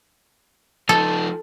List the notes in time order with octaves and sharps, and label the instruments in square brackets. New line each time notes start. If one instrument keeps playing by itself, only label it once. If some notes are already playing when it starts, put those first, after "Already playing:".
[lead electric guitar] F3 D#4 [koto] A4